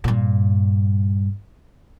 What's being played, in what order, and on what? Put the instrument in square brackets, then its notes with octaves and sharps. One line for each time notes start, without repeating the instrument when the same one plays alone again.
[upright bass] G2 A#2